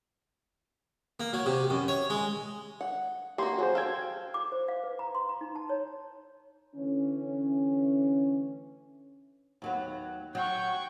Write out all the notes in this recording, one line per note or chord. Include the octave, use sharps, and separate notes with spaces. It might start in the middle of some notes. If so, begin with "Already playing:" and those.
A#3
F#3
C3
F#2
C#5
G#3
F#5
A#3 F#4 G4 C6
F#3 F#4 G#4 C5
A4 F5 G5 G#6
D6
C5
F5
B4
A#5
C6
A#5
D#4
A5
C#5
D3 E3 A3 C#4
D#2 F#3 B3
F#3 G5 C#6